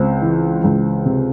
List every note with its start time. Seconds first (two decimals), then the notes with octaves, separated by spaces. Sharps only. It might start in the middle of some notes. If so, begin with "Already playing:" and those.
Already playing: C#2 C4 C5
0.22 E3
0.64 C#2
1.06 C3